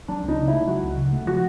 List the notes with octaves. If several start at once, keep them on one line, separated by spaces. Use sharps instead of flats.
F#3 D4
C#2
D#4
C#3
A3 E4
F#3 F#4
C#2
C#3
A3
F3 F#4